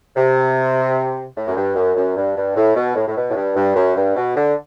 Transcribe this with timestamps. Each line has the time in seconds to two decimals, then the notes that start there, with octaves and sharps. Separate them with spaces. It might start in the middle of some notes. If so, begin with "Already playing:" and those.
0.16 C3
1.36 A2
1.47 F#2
1.56 G2
1.75 F#2
1.96 F#2
2.16 G2
2.36 G2
2.56 A2
2.75 B2
2.95 A2
3.07 A2
3.16 B2
3.29 A2
3.36 G2
3.56 G2
3.75 F#2
3.96 G2
4.16 B2
4.35 D3